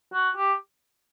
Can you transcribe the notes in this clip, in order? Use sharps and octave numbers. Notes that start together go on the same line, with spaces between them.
F#4
G4